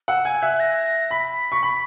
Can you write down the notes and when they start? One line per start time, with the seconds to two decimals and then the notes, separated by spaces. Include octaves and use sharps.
0.08 F#5 E6
0.25 G#5 G#6
0.42 E5 F#6
0.60 A#6
1.11 B5 B6
1.52 C#6
1.63 B5